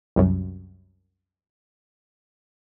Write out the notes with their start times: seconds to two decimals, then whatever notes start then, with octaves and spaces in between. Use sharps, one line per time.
0.16 C2 F#2